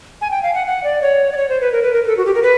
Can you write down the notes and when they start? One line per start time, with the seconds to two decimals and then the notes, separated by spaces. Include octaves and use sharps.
0.21 G#5
0.31 G5
0.43 F5
0.54 F#5
0.67 F#5
0.84 D5
1.02 C#5
1.32 D5
1.37 C#5
1.49 C5
1.61 B4
1.72 A#4
1.83 B4
1.93 A#4
2.04 A#4
2.08 A4
2.17 F#4
2.26 G4
2.35 A#4
2.43 B4